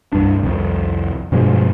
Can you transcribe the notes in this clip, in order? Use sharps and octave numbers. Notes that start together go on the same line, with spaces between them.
C2 G2 D4
C2 F2
G2 B2 F3 G#3